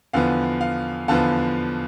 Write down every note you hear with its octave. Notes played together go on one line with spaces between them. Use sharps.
E2 D3 F3 B3 F5
F5
E2 D3 F3 B3 F5 A5